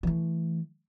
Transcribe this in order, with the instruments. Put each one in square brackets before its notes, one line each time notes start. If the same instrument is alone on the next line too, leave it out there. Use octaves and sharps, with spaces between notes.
[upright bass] E3 A3